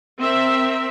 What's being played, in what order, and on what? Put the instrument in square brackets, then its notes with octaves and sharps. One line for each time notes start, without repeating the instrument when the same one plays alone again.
[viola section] C4 A#4 E5